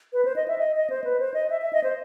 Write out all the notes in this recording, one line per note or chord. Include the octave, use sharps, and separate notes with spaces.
B4
C5
D#5
E5
D#5
D#5
C5
B4
C5
D#5
E5
E5
D#5
C5